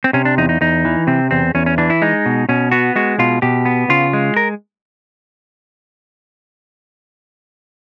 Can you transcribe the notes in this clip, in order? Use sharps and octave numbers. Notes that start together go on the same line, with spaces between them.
C4
C3 C#4
D4
E2 D#4
D#4
E2 D#4
E3
C3 C4
E2 C4
E2 C#4
C#4
E3 D4
E4
G#3 D#4
B2
B2 C#4
B3 F#4
G#3 F#4
B2 F4
B2 G4
B3
C#3 F4
G#3
A#4